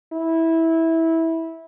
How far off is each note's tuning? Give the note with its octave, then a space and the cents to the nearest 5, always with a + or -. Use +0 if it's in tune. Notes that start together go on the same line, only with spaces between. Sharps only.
E4 -15